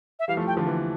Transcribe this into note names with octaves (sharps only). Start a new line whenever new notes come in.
E5
E3 G3 F5
F3 A3
G5
D3 F3
E3